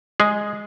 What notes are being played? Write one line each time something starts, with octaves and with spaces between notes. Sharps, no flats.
G#3 G#4